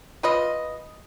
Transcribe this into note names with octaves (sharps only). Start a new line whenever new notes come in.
F4 B4 D#5